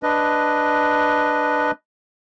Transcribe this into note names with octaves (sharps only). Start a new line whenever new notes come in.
D4 B4 D#5